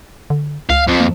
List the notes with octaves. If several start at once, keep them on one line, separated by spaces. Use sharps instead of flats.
D3
C#2 F5
F2 F3
A#3